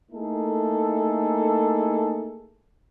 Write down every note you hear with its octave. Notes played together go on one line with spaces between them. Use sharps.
A3 A#3 D#4 E4 G#4 A4